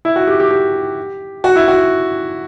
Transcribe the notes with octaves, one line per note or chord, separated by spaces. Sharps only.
E4
F#4
G4
G4
G4
F#4
E4
F#4